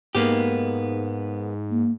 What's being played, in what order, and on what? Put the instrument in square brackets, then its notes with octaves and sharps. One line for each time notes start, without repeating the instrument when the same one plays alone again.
[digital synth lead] G#2 [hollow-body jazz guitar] A#3 B3 G4
[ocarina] A#3